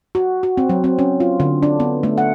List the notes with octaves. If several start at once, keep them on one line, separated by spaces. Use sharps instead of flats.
F#4
F#4
C4
F#3
C4
C#4
F4
D3
D4
B3
A3
F#5